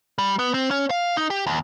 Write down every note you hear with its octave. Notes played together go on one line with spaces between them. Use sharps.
G3
B3
C4
C#4
F5
D#4
G4
D#2